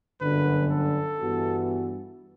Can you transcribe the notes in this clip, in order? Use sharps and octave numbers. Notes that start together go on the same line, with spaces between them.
G1 F#2 D3 B4
A4
G2 E3 B3 F#4